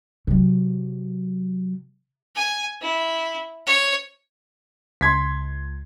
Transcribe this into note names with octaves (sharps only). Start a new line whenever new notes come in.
C3 F#3
G#5
E4
C#5
C#2 C6 G#6 B6